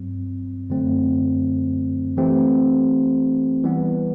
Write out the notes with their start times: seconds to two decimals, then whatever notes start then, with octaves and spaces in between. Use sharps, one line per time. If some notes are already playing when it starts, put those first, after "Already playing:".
Already playing: G2 F#3 C4
0.70 F#2 D3 F#3 A3 C4
2.17 E3 A3 C4 G4
3.64 E3 G3 B3